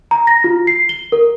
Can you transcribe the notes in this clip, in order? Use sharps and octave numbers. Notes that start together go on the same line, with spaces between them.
A#5
A#6
F4
C7
G7
A#4